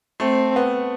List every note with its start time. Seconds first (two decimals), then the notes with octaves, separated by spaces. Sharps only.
0.20 A3 C4
0.56 B3